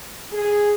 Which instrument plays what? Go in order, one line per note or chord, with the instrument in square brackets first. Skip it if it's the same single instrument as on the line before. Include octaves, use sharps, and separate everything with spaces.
[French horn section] G#4